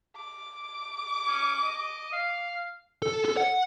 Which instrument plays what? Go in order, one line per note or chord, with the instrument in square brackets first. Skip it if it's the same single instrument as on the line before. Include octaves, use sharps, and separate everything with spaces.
[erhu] D6
[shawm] C#4
D#5
F5
[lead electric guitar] A4
A4
F#5